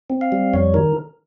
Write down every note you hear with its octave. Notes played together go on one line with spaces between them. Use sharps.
C4
F5
G3
F2 C#5
D#3 A#4